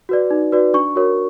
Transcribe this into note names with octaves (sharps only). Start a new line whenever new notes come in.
F#4 B4 D5
D#4
F#4 B4 D5
D4 C#6
F#4 A#4 C#5